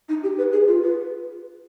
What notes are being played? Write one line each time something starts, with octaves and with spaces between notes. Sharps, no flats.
D#4
G4
B4
G#4
F4
B4